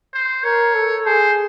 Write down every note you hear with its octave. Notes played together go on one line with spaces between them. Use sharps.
C5
A#4 C#5
A4
G#4 C5